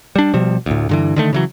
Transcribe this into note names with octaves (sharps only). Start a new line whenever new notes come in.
G3 D4
B2 F3 G3
D2 A2
G2 D3 E3
D3 D#3 A3
C#3 E3 F#3